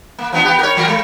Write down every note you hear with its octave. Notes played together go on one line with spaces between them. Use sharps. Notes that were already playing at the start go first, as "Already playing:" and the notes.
A#3
F3 B3 D4
B3 G4
A#4 C#5
A#2 F3 A#4
G#3